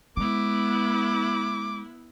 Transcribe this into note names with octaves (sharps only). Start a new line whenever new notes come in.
G#3 B3 E4 D6